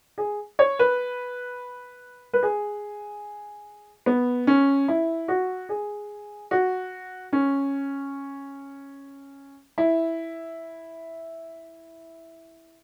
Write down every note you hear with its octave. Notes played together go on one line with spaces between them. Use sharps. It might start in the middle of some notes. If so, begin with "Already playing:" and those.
G#4
C#5
B4
B4
G#4
B3
C#4
E4
F#4
G#4
F#4
C#4
E4